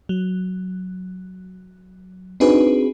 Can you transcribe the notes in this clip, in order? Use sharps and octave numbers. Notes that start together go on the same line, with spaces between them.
F#3
C4 D4 D#4 F#4 G#4 B4